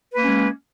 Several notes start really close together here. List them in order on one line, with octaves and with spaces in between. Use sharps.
B4 A#3 C#4 G#3